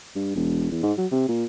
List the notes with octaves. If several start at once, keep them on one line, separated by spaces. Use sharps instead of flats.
G2
E1
E2
G#2
F#3
C3
A#2